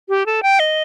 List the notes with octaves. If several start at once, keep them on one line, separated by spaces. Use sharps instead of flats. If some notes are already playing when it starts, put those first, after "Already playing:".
G4
A4
G5
D#5